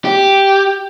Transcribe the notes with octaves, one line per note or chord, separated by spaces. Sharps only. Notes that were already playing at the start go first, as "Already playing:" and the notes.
G4